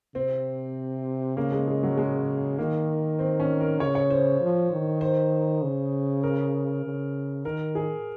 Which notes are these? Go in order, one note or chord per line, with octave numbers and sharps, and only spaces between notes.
C3 C4
C#3 A#3
G#3
G#3
F#3
G#3
D#3 A#3
C4
C#4
A#4
C#3 C#5
C#5
C5
F3
D#3
C5
C#3
A#4
C#3
D#3 A#4
G#4